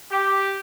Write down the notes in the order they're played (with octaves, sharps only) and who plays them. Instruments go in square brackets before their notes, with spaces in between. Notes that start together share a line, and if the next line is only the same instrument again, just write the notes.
[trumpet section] G4